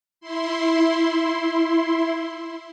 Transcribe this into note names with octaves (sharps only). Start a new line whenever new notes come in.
E4 C6